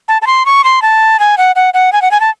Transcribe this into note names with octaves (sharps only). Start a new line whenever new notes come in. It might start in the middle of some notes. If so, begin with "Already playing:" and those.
A5
A5
C6
C#6
C6
A5
G#5
F#5
F#5
F#5
G#5
F#5
G#5
A5